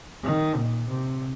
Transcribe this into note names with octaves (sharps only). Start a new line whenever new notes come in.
D#3
A#2
C3